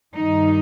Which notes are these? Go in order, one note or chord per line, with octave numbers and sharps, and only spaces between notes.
G2 D#3 D#4